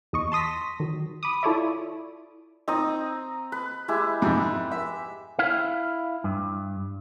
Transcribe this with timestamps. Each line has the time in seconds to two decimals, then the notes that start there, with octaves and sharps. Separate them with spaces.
0.13 E2 D#5 C#6
0.32 A5 C6 D#6 A#6 B6
0.80 D#3 F#3
1.23 B5 D6 D#6
1.43 E4 F4 A4 C#5 D5 E5
2.68 C4 D#4 A#5 D#6
3.52 B4
3.88 G#3 E4 G4
4.22 F2 G#2 C3
4.71 E5
5.39 E4 F5
6.24 G2